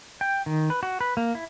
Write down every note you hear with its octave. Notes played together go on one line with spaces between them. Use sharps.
G5
D#3
B4
F#4
B4
A#3
E4